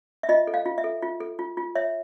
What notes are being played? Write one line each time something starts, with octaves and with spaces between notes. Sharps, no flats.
E5
F4 D#5
A4
F5
F4
E5
A4
F4
A4
F4
F4
C#5 E5